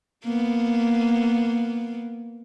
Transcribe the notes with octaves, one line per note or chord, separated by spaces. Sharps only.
A#3 B3